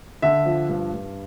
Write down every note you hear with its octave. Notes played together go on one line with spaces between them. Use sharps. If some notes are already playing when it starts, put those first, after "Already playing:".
D3 E5
F3
G2
G2